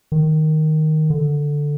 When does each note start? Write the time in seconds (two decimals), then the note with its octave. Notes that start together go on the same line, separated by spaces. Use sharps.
0.12 D#3
1.10 D3